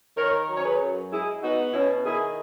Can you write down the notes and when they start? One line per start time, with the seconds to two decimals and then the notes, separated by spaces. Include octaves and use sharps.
0.17 D#3 A#4 C#5
0.49 F#3
0.56 C#5
0.64 G#4 B4
0.80 F#2
1.12 G#3 E4 G#4
1.42 B3 D#4 F#4
1.73 B2 C#4 E4
2.05 D#3 E4 G#4